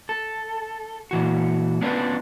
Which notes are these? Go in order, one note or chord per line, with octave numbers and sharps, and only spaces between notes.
A4
A#2 E3 F#4
B3 C#4 D4 F4 B4 D5